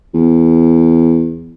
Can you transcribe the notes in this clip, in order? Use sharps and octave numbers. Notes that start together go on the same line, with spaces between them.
E2